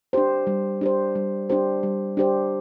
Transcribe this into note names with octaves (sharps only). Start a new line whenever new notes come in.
D4 G4 C5
G3
D4 G4 C5
G3
D4 G4 C5
G3
D4 G4 C5